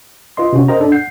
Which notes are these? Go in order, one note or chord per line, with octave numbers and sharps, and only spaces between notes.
F4 B4 D#5 C6
C3 C#4 F#4
A#4 C5 D#5 G5 A#5
D4 A4 D5
F#5 G6 C7